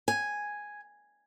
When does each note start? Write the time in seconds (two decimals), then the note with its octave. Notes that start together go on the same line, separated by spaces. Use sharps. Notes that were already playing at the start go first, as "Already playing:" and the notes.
0.08 G#5